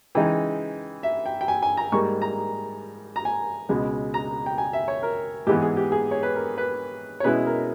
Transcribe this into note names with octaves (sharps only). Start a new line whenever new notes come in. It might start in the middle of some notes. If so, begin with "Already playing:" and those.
C#3 E3 G#3 D#4 G5
E5
G5
G5
G#5
G#5
A#5
G#2 G3 A#3 C#6
A#5
A#5
G#5
C#2 B2 G#3
A#5
G5
G#5
E5
C#5
A#4
G#2 E3 G#3 B3 G4
G#4
G4
G#4
C#5
B4
A#4
B4
C#5
B2 G#3 C#4 E4 B4
A#4